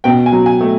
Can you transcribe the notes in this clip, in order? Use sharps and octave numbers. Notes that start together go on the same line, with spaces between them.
B2 G5
G#5
F#3
G#5
A3